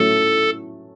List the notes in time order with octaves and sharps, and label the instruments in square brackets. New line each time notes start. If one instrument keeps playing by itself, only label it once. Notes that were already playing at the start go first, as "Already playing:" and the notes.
Already playing: [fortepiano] A2 F#3 A3 C#4 [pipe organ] A4